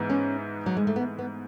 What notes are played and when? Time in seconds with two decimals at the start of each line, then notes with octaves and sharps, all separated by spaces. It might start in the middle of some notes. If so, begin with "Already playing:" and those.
Already playing: G#2 E3 B3
0.10 C#4
0.66 F#3
0.77 G#3
0.87 A3
0.96 B3
1.19 B3